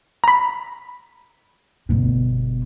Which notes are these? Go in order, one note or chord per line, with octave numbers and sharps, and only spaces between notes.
A#5 B5
G1 B2